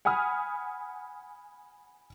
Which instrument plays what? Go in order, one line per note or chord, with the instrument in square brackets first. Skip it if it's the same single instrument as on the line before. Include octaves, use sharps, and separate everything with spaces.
[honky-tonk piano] F#5 G#5 B5 D#6 F6